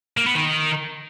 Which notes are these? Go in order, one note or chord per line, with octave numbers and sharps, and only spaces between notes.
A#3
B3
D#3